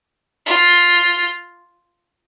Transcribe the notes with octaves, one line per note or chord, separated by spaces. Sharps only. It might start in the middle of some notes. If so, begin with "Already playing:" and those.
F4